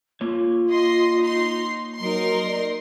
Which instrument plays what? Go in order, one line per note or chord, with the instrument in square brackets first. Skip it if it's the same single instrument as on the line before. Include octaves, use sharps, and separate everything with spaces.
[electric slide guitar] A#3 C#5 [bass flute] F4
[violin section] D#5 C6
D#4 C6
[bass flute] F#3 [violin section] D#4 A#4 C6
[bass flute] D5